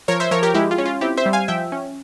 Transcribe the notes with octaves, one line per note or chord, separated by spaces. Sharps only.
F3 A#4 C#5
C5 E5
F3 A#4 C#5
G4 A#4
G#3 E4 G4
F4
C#4
F4
C4 E4 G4
C5 E5
G3
F5 G#5
F3 E5 G5
C#4